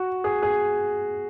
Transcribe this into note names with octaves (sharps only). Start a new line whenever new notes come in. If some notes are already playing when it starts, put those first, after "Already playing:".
Already playing: F#4
G#4
G#4